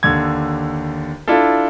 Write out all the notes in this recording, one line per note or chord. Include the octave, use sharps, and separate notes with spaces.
D#2 D3 G#6
D4 E4 F4 A4